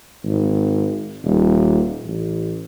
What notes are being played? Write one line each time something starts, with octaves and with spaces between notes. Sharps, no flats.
G#1
D#1
A1